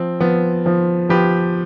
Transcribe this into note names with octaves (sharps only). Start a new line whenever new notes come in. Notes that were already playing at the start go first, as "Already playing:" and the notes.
Already playing: F3 C4
F3 B3
F3
F3 G4 B4